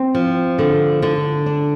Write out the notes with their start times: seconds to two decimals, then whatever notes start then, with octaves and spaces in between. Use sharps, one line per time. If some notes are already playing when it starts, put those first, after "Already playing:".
Already playing: C4
0.15 F3
0.59 D3
1.02 D3
1.46 D4